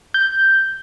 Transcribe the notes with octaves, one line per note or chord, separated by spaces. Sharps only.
G6